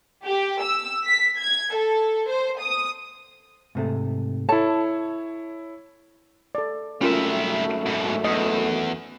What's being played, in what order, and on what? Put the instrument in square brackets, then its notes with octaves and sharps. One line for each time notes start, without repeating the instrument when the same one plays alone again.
[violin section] G4
E6
B6
G#6
A4
C5
D#6
[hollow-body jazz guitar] G#2 C3 A3
[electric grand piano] E4 C#5 [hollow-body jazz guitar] A4 [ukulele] A5
[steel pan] A4 D5
[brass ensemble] G#1 F#2 A3 [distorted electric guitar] G3 E5 [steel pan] C#4 F4 A#4
[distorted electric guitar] G#2 B2
[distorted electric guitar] E2 [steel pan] D#5